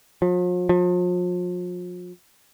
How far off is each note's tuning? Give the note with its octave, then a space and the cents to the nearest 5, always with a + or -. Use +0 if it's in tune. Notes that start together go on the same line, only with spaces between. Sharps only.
F3 +45
F3 +40